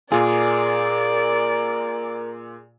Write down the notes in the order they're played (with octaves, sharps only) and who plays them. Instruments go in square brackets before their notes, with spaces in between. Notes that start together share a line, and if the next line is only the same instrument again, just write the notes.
[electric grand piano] A#2 F4 [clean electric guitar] G#4 [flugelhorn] A#4 [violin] D5